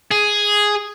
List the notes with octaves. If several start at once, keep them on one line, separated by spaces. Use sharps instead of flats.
G#4